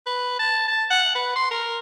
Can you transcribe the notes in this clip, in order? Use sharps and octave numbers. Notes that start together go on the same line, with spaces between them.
B4
A5
A5
F#5
B4
C6
A#4